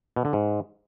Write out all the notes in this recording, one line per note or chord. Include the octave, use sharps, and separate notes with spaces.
B2
D3
G#2